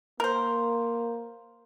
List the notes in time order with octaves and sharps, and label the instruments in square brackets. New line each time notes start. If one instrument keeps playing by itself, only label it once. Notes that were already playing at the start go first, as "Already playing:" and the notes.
[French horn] A#3 [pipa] A#4 C5